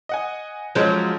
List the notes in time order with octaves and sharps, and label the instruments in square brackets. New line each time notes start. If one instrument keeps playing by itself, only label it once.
[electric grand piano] D#5 F#5 G#5
[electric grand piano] F3 C#4 G6 [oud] F#3 G#3